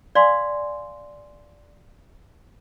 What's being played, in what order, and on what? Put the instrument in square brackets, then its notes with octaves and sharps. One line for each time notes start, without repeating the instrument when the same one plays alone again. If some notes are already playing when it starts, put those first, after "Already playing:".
[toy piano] D5 F5 G#5 C6